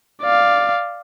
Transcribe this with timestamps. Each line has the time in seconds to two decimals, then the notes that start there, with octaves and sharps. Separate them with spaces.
0.22 D5 F5